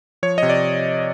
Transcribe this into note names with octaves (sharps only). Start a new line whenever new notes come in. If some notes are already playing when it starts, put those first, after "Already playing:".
F3 C#5
C3 D#5
D5